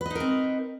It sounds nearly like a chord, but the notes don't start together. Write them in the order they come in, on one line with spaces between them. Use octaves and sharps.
B4 D#5 D#4 A#4 C4